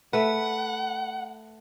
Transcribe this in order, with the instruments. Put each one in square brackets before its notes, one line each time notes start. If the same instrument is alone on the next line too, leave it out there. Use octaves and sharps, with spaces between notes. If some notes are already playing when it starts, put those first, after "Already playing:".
[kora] A3 B4 [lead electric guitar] F#5